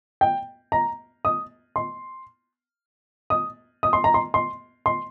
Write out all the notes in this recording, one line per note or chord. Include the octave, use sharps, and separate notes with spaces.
G5
A#5
D#6
C6
D#6
D#6
C6
A#5
C6
C6
C6